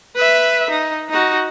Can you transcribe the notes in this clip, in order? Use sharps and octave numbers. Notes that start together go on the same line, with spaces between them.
B4 E5
D#4
D#4 F#4